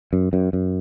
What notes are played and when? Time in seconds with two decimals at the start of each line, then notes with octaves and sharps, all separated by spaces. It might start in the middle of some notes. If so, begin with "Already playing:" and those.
0.13 F#2
0.33 F#2
0.53 F#2